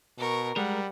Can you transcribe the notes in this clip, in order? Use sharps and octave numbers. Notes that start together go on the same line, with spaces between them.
B2 A#4 C#6
G3 G#3 A#4 F#5